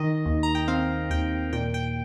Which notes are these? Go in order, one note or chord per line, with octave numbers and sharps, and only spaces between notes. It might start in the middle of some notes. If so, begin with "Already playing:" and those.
Already playing: D#3 D#5
D#2
A#5
G5
C4 F5
D#2 G5
A#2 G5
G5